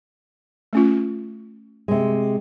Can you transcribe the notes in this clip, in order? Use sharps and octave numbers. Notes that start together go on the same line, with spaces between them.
A3 C#4 F4
C3 G#3